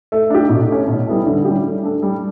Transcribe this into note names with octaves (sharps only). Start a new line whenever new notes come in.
A3
D4 G4
B2
A3 C#4
B2
G3 B3 E4 A4
D3
G3 C#4 G4
A3
D4 A4
G3